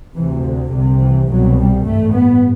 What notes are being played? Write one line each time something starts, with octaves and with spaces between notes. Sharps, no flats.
D2 C3 E3
D3
C2 C3
E3
C2 B2 F#3
G3
A1 G2 A3
B3